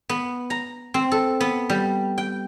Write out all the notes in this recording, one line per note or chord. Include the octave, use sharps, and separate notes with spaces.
B3
A#5
C4
A4
B3
G3
G5